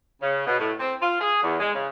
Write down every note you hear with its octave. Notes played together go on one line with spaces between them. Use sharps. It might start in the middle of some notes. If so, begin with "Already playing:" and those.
C#3
B2
A2
C4
F4
G#4
E2
G#3
C#3